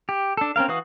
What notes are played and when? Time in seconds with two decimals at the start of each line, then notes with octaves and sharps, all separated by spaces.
0.09 G4
0.37 D4 A4
0.56 C4 C#4 A#4 F5
0.68 E3 F#4 B4 F5 D#6